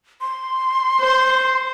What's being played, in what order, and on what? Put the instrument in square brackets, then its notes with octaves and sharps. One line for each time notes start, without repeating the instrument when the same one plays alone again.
[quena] C6
[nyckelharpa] C5